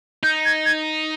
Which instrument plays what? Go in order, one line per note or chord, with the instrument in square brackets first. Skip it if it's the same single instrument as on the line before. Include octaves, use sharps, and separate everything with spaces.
[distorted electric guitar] D#4 [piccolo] G6
[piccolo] G#6
G#6